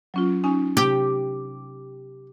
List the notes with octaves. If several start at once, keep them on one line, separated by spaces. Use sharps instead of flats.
F#3 C#4 F4
C#4 D#4 G#5
C3 G4